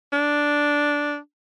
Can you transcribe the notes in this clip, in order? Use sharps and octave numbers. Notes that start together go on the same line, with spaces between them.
D4